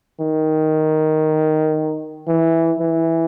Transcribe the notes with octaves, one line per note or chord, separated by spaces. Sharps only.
D#3
E3
E3